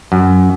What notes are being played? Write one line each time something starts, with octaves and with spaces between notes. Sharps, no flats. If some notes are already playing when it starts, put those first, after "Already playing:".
F#2